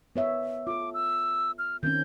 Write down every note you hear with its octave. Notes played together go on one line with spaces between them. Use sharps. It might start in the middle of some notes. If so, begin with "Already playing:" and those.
B3 C#5 E5
F4 A4 D6
E6
F6
D#3 C4 C#4 G6